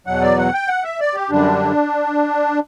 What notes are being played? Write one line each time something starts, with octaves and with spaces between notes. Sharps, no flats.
E2 B2 F#3 F#5
D5
F#5
G5
F#5
E5
D5
G4
F#2 D3 G3 D4